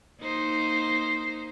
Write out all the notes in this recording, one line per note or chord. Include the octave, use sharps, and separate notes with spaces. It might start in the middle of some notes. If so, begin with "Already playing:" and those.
A#3 D#4 C5